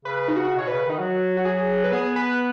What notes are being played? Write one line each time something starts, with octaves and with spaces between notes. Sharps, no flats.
C#3 B4
D#4
F#4
B2 C#5
C#3 B4
D#3
D#4
F#3 F#4
F#4
G#4
B4
B3 G#4
B4